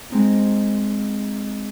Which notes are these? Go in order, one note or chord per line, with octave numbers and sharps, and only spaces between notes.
G#3 C4 D#4